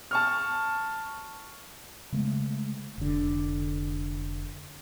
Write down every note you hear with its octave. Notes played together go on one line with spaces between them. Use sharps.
A5 C#6 F6
C#3 G#3 A3
F1 D3